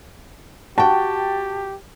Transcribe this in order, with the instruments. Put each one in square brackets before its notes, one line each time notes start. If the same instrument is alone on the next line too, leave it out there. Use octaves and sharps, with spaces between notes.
[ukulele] F#4 G5 [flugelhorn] G4 [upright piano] A5